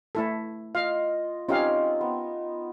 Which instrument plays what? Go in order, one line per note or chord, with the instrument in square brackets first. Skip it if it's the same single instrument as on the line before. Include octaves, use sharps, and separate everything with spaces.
[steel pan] A3 E4 A4
[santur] F4 D#5 [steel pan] F5
[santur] C4 D#4 F4 [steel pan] C#4 G4 F5
[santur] B3